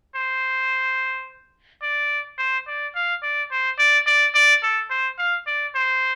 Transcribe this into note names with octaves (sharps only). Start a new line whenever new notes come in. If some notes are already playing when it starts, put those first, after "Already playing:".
C5
D5
C5
D5
F5
D5
C5
D5
D5
D5
A4
C5
F5
D5
C5